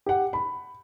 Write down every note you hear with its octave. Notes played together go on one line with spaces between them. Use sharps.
G4 F#5
B5